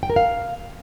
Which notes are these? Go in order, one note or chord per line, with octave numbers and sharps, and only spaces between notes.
G5
A#4
F5